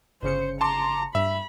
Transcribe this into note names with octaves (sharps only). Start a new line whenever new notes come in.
G1 C#3 C5 C#7
A5 A#5 C6 D6
G2 E5 B5